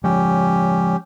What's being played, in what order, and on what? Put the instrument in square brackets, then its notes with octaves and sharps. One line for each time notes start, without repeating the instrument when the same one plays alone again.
[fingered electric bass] F3 G#3 [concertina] C#4 G4